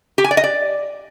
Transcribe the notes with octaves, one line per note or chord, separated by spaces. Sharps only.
G4
G#5
D5
D#5
D5